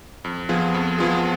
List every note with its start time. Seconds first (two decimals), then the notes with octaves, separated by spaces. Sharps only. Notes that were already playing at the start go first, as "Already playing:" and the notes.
0.24 F2
0.49 F3 B3 F4 G#4
0.74 F2
0.98 F3 B3 F4 G#4